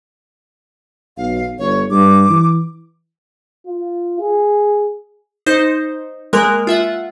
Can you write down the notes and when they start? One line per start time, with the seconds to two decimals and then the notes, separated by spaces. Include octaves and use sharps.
1.17 B1 F5
1.59 G1 C#5
1.90 G2 D6
2.29 E3
3.66 F4
4.20 G#4
5.47 D#4 C5 G6
6.33 G#3 A#3 A#4 F#6
6.67 F4 E5 F#5